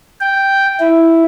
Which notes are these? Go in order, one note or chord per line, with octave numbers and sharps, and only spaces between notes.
G5
E4